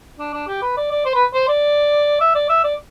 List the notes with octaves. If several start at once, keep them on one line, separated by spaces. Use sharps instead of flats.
D4
D4
G4
B4
D5
D5
C5
B4
C5
D5
E5
D5
E5
D5